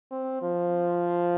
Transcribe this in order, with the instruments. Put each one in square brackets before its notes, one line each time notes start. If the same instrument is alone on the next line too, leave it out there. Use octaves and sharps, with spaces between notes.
[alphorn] C4
F3